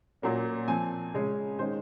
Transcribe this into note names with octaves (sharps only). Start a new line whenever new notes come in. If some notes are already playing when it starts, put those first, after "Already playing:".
A#2 F#3 A#3 C#4
F3 C4 G#5
C#3 G#3 C#4
D#3 G#3 C#4 C5